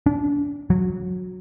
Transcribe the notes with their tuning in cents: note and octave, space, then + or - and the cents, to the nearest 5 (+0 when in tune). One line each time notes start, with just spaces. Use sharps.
D4 -30
F#3 -20